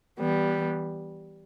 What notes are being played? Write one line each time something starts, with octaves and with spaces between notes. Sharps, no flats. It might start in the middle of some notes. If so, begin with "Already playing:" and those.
E3 G3 B3